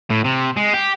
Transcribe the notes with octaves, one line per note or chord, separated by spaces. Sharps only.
A2
C3
G#3
G4